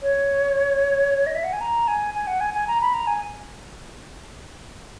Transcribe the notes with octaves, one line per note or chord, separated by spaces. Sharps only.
C#5
D#5
E5
F#5
G#5
A#5
G#5
G#5
F#5
G#5
G#5
A#5
B5
A#5
G#5